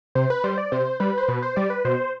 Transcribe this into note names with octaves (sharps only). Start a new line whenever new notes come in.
C3 C5
B4
G3 C5
D5
C3 C5
G3 B4
C5
B2 B4
C5
G3 D5
B4
B2 C5